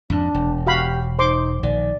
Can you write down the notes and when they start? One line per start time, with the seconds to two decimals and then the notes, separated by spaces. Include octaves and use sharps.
0.10 F2 G#2 D4
0.34 E1
0.67 F#4 G4 F5 B5
1.19 D#4 C5 C6 D6
1.63 A#1 D#3 D5